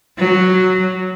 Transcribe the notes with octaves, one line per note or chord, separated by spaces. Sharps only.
F#3